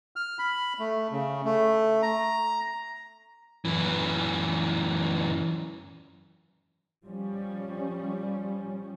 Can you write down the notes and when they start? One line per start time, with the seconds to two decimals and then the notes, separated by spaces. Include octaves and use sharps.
0.16 F6
0.39 B5
0.79 A3
1.12 C#3
1.45 A3
2.03 A#5
3.65 F#2 E3
7.05 F3 G3 C#4